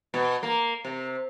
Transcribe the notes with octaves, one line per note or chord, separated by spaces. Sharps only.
B2
A#3
C3